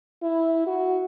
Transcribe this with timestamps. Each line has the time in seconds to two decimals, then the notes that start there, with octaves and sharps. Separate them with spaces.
0.22 E4
0.67 F#4